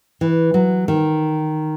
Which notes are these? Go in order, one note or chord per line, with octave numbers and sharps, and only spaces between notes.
E3
F#3
D#3